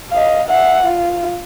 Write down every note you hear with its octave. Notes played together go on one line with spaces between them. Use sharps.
D#5 F5
E5 F#5
F4